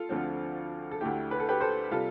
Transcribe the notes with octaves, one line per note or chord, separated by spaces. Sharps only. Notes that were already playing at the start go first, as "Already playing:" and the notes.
Already playing: F4 A4
D2 D3 F3 C4
A4
D2 D3 A3 E4 G4
B4
A4
G4 B4
A4 C5
C3 G3 F4 A4